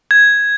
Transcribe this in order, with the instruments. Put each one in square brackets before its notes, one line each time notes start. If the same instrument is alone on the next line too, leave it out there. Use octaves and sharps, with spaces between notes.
[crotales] G#6